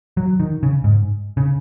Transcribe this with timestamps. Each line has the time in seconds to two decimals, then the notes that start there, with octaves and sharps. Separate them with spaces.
0.17 F#3
0.40 D#3
0.63 C#3
0.84 G#2
1.37 C#3